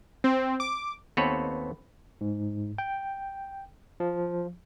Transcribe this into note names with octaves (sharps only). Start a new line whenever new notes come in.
C4
D6
D#2 B3 C4 A4 B4 C#5
G#2
G5
F3